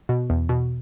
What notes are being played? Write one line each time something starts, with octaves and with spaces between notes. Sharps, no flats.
B2
E2
B2